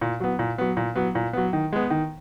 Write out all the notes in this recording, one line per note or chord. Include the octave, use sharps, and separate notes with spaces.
A#2
F#3 B3
A#2
F#3 B3
A#2
F#3 B3
A#2
F#3 B3
D#3
G#3 B3
D#3